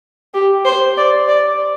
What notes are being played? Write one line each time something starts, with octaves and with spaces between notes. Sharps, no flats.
G4
C5
D5
D5